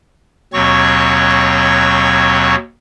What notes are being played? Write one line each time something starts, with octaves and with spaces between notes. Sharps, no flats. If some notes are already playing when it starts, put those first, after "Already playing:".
D#2 B2 F#3 C4 C#5 C#6